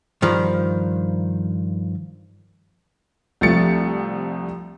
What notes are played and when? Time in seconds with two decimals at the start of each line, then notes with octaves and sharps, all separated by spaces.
0.22 G2 D#3 F3
3.41 C2 F3 A3 C4 A6 C#7